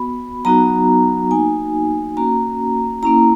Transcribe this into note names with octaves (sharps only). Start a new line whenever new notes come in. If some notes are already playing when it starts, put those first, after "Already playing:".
Already playing: B3 F#4 B5
F#3 B3 D#4 F#4 A#5
A#3 D#4 F#4 G#5
A#3 C#4 F#4 A#5
A#3 C#4 E4 A#5